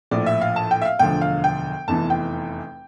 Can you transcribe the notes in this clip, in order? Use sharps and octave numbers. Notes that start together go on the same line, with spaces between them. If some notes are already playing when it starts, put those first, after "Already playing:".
A#1 A2 F3 D5
E5
F5
A5
G5
E5
F5
E1 D2 D3 F3 G5
F5
G5
F1 E2 E3 A5
G5